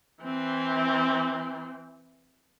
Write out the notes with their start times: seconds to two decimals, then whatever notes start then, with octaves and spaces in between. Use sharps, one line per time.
0.23 E3 C4